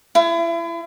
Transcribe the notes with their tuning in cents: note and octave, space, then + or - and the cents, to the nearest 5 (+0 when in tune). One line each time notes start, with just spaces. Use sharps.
E4 +35